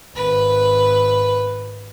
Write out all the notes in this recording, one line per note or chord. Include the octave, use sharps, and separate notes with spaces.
G#1 B4